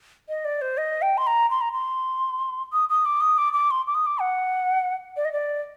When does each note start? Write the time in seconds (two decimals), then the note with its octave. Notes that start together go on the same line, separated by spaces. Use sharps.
0.29 D#5
0.45 D5
0.62 C5
0.78 D#5
1.02 G5
1.18 C6
1.27 A#5
1.51 C6
1.61 A#5
1.72 C6
2.73 D#6
2.89 D#6
3.05 D6
3.21 D#6
3.38 D6
3.53 D6
3.71 C6
3.87 D6
3.95 D#6
4.06 D6
4.19 F#5
5.17 D5
5.25 D#5
5.32 D5